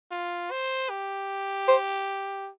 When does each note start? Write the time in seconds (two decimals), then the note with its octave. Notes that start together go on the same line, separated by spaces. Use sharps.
0.11 F4
0.51 C5
0.90 G4
1.68 C5